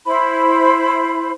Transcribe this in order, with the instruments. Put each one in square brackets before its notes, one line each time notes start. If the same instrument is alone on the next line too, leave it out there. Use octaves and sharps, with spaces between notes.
[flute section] E4 C5 B5